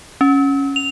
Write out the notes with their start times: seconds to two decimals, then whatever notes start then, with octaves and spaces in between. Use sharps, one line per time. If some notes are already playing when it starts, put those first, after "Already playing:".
0.21 C#4
0.76 F7